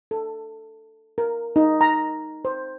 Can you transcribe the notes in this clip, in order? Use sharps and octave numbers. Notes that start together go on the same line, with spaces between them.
A4
A#4
D#4
A#5
C5